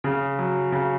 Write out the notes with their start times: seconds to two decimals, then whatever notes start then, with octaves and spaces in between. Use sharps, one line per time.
0.04 C#3
0.39 F#3
0.72 C#3